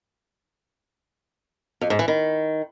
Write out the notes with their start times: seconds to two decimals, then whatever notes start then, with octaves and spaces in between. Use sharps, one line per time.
1.81 F2
1.90 G#2
1.99 E3
2.08 D#3